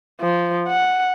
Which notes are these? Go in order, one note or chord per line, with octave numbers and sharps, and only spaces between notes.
F3
F#5